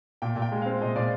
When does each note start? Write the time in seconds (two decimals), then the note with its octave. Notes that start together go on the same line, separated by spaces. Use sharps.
0.22 A#2 G5
0.36 A#2
0.42 G5
0.52 G#3
0.62 C4 F5
0.81 A#2 D#5
0.96 A#2 D5